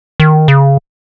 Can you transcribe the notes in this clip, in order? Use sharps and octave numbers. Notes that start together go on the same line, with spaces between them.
D#3
C#3